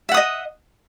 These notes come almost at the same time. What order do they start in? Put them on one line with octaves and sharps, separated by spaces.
E5 F#5 D#6 D#5